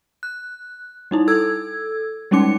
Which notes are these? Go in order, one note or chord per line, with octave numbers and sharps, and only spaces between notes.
F#6
G3 D#4 E4
A4 E6 G#6
G3 G#3 C#4 D#4 D6 C#7